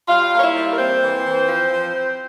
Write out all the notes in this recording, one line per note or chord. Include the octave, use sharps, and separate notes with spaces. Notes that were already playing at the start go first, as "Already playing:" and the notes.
G3 F4 F5
A#3
C#5
E4 E5
G3
A#4
A#3 C4 C5
E3
E3
F3
F3
C4